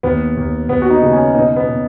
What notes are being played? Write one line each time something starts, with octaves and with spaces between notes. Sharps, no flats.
D#2 B3
D#2
D#2 B3
F#4
D#4
C#3
C#4
B2 D#4
B3
B2